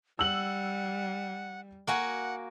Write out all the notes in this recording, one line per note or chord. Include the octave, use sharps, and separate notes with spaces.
G3 F#5 E6 F#7
A#3 F#4 F#5 G#5